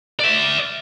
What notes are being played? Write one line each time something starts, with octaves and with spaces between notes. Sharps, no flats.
D5 E5